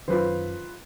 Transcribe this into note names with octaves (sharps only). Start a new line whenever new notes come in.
F#2 D#3 F4 B4 C5